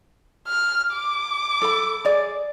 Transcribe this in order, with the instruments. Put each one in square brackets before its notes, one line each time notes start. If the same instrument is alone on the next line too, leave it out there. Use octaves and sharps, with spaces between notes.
[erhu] F6
D6
[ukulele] A4 B5
G#4 D5